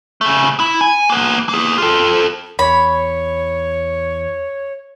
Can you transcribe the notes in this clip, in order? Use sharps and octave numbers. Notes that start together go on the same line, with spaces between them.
C#3 A3
E4
G#5
A#3 B3
A#3 G#4
F4 A4
E2 C#5 B5